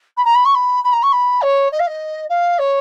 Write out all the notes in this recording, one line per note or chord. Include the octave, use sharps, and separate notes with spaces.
B5
A#5
B5
C#6
B5
B5
A#5
C#6
B5
C#5
D#5
F5
D#5
F5
C#5